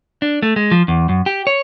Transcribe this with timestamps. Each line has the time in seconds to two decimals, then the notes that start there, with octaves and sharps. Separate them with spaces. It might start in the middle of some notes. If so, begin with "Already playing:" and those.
0.22 D4
0.42 A3
0.56 G#3
0.71 F3
0.88 E2
1.09 F#2
1.26 G4
1.47 C#5